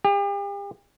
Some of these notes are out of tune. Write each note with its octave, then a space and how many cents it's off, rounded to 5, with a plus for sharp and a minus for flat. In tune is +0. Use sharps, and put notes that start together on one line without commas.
G4 +40